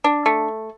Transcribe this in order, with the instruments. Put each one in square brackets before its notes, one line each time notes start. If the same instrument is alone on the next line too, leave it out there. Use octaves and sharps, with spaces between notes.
[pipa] D4
A3